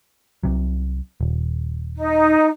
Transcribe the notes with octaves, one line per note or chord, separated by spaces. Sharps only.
C2 C3 F#3
D#1
D#4